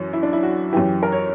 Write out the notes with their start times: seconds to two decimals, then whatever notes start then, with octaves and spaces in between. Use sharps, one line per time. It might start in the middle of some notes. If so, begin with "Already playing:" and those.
Already playing: F#2 E3
0.13 E4
0.23 D4
0.33 E4
0.43 F#4
0.73 F#2 E3 G4
1.03 A#4
1.12 C#5